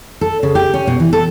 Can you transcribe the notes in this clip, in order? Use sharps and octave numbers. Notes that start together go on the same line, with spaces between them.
A4
C#3
G4
C#4
B2
E3
A4